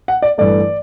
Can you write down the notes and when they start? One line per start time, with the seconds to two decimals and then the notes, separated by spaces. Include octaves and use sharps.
0.08 F#5
0.22 D5
0.38 G2 E3 A3 D5